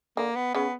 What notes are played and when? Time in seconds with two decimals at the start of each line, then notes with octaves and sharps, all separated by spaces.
0.17 D3 A#3
0.36 B3
0.55 C#3 B3